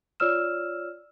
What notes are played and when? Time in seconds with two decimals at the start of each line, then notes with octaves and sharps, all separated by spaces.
0.20 F4 C#5 D5 E6 F6 E7